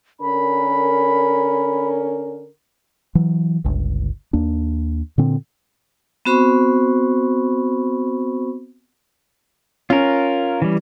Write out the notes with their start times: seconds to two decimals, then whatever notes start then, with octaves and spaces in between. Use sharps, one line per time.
0.20 D3 C#4 A#4 B5
3.15 E3 F#3
3.64 G1 C#2
4.33 D#2 A#3 D4
5.18 A#2 D3 C4
6.25 B3 C4 F#4 C5 B5 C#6
9.90 C#4 F4 A#4
10.62 E3 G3